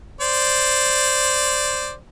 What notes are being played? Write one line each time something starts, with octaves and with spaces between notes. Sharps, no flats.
C5 D5